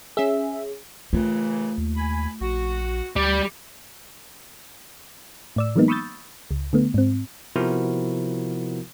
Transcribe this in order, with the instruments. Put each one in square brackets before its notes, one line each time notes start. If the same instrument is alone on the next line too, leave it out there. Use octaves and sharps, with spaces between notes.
[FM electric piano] C#4 G#4 [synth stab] E5
[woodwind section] D#2 C#3 E3 [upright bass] A3 F4
[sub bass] D#2
[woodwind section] G#5 B5
[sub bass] A#1 [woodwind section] F#4
[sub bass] D2 [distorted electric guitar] G3 [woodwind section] D6
[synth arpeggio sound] A2 D5 E6
E3 F#3 G#3 A#3 B3 D#4
B5 C#6 D#6 E6 G6 A6
C#2
D3 A3 B3
G#2 C4
[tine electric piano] C3 F3 B3 E4 F#4 A#4